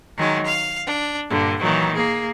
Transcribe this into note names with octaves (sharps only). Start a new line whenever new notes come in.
D#3 F#3 G#3
F5
D4
G2 A#2 D3
A#2 D#3 E3 F#3
A#3 G#4